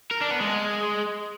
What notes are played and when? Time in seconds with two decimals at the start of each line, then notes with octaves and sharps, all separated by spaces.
0.11 A#4
0.21 D4
0.30 B3
0.40 G#3